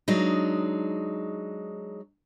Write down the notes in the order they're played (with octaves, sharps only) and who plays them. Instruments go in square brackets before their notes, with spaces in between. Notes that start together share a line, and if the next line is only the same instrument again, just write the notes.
[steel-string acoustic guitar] F#3 G#3 D4 D#4